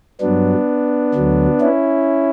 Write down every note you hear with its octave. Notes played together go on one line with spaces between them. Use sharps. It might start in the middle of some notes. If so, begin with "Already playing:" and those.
G2 F#3 B3 D4
D2 D3 F#3
C#4 E4